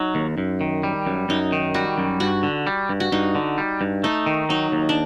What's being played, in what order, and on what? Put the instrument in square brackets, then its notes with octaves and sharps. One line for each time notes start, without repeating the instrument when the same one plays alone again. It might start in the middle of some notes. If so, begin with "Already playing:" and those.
Already playing: [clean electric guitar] F#3 [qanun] D#4
[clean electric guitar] D#2
F#2
D#3
G3
F#2
[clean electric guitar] F#2 [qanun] D#4
[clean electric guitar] D#3
[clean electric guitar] G3 [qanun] F#4
[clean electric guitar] F#2
[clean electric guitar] G2 [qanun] F#4
[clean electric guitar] D3
G3
G2
[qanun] F#4
[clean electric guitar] G2 [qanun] D#4
[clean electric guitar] D3
G3
G2
[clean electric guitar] A3 [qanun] D#4
[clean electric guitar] D#3
[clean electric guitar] F#3 [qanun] D#4
[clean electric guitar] D#2
[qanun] D4